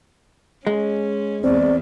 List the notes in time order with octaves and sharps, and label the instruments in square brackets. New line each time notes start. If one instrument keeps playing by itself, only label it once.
[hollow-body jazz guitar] G#3 [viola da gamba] C#4
[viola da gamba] E2 [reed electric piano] C4 [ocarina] D5